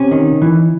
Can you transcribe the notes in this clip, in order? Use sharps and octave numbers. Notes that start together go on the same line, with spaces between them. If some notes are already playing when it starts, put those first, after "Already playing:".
Already playing: C3 C#4
D#3
E3